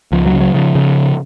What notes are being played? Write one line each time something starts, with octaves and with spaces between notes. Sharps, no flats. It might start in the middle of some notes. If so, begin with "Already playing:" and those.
C#2 F3
F#3
C#3
F#3
C#3 F3
C#3